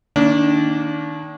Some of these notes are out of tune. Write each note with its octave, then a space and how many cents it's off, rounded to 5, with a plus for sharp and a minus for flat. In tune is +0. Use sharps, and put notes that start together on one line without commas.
D#3 +0 A#3 +0 D4 -30